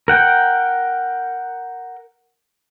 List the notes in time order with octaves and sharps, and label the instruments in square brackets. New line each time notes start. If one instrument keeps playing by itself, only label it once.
[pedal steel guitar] A#4 F#5 G5